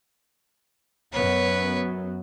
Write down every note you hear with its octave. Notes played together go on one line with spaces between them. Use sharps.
F#2 F#3 B3 B4 C#5